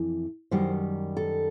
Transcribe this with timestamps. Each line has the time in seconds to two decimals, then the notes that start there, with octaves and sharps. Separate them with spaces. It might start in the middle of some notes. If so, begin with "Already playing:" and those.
Already playing: F2 E3
0.51 F#2 D#3 G3 C5
1.17 A4